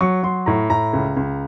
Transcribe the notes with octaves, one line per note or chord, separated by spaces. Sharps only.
F#3 C#6
F#3 C6
A2 A#5
A2 A#5
C#2
C#2